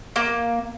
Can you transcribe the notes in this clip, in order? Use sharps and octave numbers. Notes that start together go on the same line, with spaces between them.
A#3